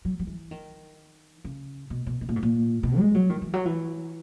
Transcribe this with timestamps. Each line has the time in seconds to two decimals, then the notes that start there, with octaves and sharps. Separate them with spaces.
0.05 F#3
0.19 F#3
0.27 E3
0.51 D#3
1.44 C#3
1.90 B2
2.07 B2
2.21 B2
2.29 A#2
2.36 G#2
2.43 A#2
2.83 B2
2.99 G#3
3.15 F#3
3.30 D#3
3.42 E3
3.53 F#3
3.65 E3